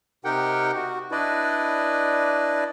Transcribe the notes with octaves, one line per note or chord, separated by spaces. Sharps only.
C3 D#4 G4 A#4 F#5 G5
F#4
D4 E4 B4 D5 D#5